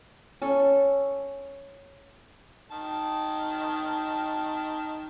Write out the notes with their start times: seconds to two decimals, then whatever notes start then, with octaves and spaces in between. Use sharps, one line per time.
0.42 C#4 A4
2.72 D#3 A5